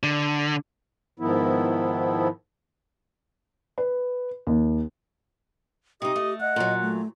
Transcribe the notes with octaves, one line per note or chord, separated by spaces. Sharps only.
D3
G#2 D#3 F3 B3 E4
B4
D#2
C3 D#4 G4 D#5
A3
D#5 F#5
A#2 F#3
A3